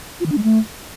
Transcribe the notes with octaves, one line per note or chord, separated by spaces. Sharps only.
F4
D#3
D4
G#3
A3